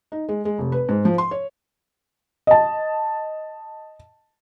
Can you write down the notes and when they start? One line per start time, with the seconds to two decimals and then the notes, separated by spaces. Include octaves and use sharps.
0.12 D#4
0.29 G#3
0.45 G#3
0.59 F1
0.72 B4
0.89 G#2
1.05 F3
1.18 C6
1.31 C#5
2.47 D#5 A5